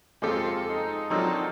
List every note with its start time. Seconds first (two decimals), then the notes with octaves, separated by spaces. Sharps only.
0.22 F2 G#3 F4 G4 A4
0.69 D#4
1.10 F3 F#3 C4 D4 D#4 A4 A#4